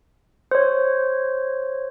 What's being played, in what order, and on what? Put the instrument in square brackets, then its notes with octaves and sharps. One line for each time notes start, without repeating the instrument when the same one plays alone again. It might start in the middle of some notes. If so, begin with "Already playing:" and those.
[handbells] C5 C#5